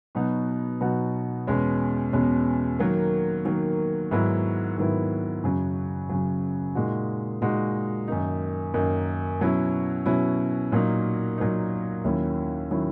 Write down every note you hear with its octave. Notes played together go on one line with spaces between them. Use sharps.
B2 F#3 B3 D#4 F#4
B2 F#3 B3 D#4 F#4
E2 B2 G#3 C#4
E2 B2 G#3 C#4
D#3 F#3 A#3
D#3 F#3 A#3
G#2 D#3 F#3 B3 E4
G#2 D#3 F#3 B3 E4
F#2 C#3 F#3
F#2 C#3 F#3
A#2 G#3 D#4 F#4
A#2 G#3 D#4 F#4
F#2 D#3 A#3 D#4
F#2 D#3 A#3 D#4
B2 F#3 C#4 E4
B2 F#3 C#4 E4
A#2 F#3 A#3 D#4
A#2 F#3 A#3 D#4
D#2 D#3 F#3 C#4 E4
D#3 F#3 C#4 E4